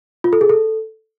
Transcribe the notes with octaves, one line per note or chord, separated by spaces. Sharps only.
F4
A4
G#4
A4